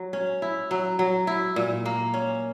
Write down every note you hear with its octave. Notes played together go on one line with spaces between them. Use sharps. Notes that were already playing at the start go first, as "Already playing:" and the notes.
Already playing: F#3
C#4
E4
F#3
F#3
E4
A#2
A#3
C#4